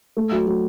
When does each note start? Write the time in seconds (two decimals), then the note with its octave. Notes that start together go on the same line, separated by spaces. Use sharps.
0.17 A3
0.32 F#3
0.47 F#3